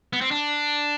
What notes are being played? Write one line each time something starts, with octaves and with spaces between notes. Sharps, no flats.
B3
C4
D4